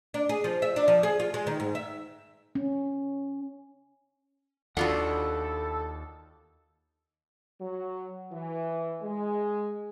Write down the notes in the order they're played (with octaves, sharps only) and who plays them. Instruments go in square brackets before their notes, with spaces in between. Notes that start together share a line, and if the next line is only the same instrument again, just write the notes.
[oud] D4
G#4
F3
E5
D4
F3
G#4
F4
G#3
D#3
G#2
E5
[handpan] C#4
[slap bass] D#2 [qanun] D4 F4 F#4 [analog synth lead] A4 [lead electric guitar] F#5 B5
[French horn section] F#3
E3
G#3